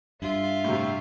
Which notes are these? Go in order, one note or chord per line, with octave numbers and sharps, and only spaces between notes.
G2 F4 E5
A2 C3